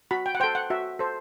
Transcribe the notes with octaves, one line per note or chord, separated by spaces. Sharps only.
F#4 B5
G5
F#5
A4 C5 G5
F#5
F#4 E5
A4 C5